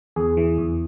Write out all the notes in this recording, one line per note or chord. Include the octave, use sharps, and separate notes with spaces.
E2 G#4
E3
E2